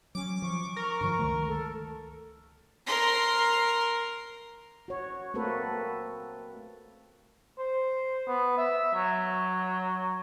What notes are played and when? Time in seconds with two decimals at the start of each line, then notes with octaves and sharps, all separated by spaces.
0.15 F#3 C#4 D6
0.42 F3 C#6
0.76 A#4
1.01 G2 D3 F3
1.19 C#2 D#3 A3
1.48 A4
2.86 A#4 C6
4.88 F#4 C#5
5.34 A3 A#3 C4 F#4 A4 B4
7.58 C5
8.27 B3
8.58 E5
8.94 F#3